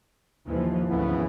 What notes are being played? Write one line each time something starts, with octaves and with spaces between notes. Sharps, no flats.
D#2 E3 F3
G#1 D2 C#3 B3 E4